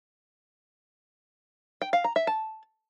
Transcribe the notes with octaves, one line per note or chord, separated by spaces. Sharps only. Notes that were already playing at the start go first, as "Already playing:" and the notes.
G5
F5
A#5
E5
A5